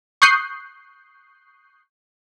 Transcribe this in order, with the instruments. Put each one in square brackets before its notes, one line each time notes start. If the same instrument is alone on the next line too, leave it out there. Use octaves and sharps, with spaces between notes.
[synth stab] C#6 D#6 F#6 G6 C7